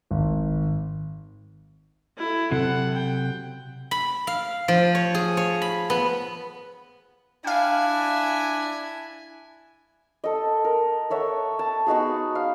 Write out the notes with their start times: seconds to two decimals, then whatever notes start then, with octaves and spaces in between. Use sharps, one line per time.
0.11 G#1
2.18 E4 A4
2.51 C3 F#3 A4 F#5
2.94 G5
3.91 B5
4.27 F5
4.68 F3
4.95 C#5
5.15 G#4
5.37 C#5
5.62 B5
5.90 B3
7.44 D4 E4 F5 G5 G#5
10.24 A4 D#5
10.64 A#4
11.10 A4 C#5 E5 F#5
11.59 A5
11.87 B3 D#4 F#4 G#4
12.35 F5